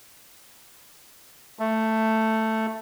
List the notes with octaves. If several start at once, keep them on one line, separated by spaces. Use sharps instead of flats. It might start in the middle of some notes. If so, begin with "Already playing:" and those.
A3